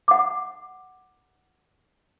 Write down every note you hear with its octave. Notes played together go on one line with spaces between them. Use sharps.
F#5 D6